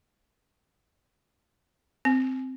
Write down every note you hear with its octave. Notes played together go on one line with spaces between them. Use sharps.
C4